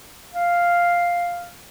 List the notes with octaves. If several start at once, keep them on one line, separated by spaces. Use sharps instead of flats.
F5